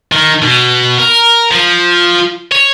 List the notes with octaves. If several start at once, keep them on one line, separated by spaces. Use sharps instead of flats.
D#3
B2
A#4
F3
C#5